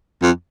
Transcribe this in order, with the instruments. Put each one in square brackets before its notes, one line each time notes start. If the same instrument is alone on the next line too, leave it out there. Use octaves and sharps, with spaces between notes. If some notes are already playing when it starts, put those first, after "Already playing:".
[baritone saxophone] F2